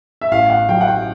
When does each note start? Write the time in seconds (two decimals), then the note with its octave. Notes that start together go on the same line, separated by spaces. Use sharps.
0.21 E5
0.31 A1 F5
0.50 F#5
0.68 F#3 G5
0.81 F#5
0.87 G5